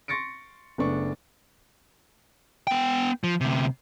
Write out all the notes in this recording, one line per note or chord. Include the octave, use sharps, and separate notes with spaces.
C6 C#6 A6 A#6 C#7 D7
F#1 A3 B3 D4 C#6
B3 G5
F3
D2 C3